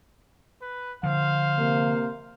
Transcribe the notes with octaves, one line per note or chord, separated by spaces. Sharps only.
B4
D3 F3 C5 F5
C3 A#3